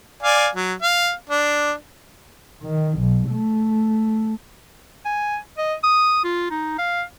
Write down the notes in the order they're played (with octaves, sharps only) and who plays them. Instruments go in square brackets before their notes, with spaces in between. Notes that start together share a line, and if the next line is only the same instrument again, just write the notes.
[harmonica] D5 F5 G#5
F#3
F5
D4
[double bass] D#3
B1
A3
[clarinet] G#5
D#5
D#6
F4
D#4
F5